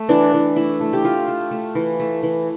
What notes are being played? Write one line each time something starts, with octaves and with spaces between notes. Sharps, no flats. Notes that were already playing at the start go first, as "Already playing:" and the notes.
Already playing: A3
E3 D4
E3
A3 E4
A3
G4
A3 F4
A3
A3
E3
A3
E3